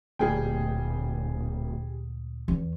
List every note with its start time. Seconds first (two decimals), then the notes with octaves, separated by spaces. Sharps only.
0.19 D1 D2 A#2 G3 G#4 G5
2.48 E2